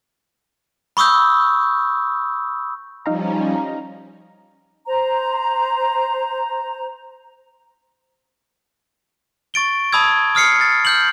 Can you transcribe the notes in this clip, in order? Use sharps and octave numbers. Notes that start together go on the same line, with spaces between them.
B5 C#6 D#6 E6 G6
F3 G3 C#4 D#4 F5 A#5
C5 A#5
C#6 A6 D7 G7
A5 B5 D#6 E6 G#6
D#6 F6 C7 C#7
A6
F6 G6 F#7